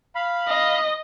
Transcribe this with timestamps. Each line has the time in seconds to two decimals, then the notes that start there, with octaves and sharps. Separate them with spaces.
0.15 F5 B5
0.47 D#5